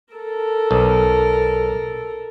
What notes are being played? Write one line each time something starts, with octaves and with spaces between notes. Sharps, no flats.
A4 A#4
B1